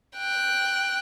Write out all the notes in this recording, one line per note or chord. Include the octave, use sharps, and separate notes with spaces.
G5 F#6